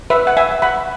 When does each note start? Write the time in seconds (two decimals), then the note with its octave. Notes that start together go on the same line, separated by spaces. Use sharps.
0.10 B4 E5
0.27 F#5
0.37 E5 G#5
0.62 F#5 B5